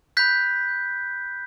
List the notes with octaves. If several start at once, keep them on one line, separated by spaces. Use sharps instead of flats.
B5 F#6 G6 B6